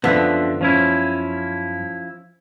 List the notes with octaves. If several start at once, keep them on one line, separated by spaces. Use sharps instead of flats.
F#2 D3 F3 B3 E5
F3 C#4 E4